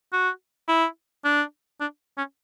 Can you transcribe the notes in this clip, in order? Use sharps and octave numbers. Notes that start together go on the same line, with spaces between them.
F#4
E4
D4
D4
C#4